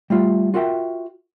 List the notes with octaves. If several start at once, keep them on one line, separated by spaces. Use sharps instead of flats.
G3 A3 F4
F4 F#4 A#4 E5 G5